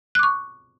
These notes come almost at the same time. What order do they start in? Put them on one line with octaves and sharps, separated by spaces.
F#6 D6 C#6